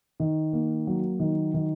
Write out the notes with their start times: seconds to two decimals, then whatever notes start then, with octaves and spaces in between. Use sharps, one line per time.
0.20 D#3
0.53 A#3
0.87 F#3
1.20 D#3
1.54 D#3